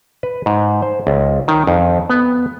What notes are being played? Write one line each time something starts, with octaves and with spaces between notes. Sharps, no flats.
B4
G#2
C5
C#2
D#3
F2
B3